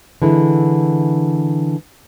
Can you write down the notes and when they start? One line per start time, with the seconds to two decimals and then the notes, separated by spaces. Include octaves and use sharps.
0.22 D3 E3 G#3 E4